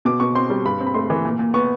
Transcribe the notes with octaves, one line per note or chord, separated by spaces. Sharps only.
B2 D6
B2 C#6
C4 C6
G3
G2 B5
C4
B5
A3 C6
E3
A#2
A#2
B3 C#6